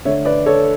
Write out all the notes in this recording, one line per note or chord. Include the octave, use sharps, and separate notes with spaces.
D3 A3 D4 C#5 E5
B4 D5
A4 C#5